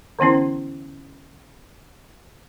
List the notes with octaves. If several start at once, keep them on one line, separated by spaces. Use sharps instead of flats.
D3 E3 B3 C#4 E4